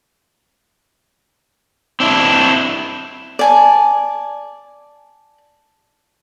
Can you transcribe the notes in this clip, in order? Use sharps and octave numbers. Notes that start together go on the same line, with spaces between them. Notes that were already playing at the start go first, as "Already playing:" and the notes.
C4 D4 E4
D5 G#5 A5